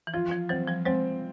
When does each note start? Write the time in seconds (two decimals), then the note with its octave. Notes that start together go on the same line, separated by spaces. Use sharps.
0.07 E3
0.14 F3 F4
0.31 F3
0.49 E3 F#3 C4
0.67 F3 G3
0.85 F#3 G#3 C4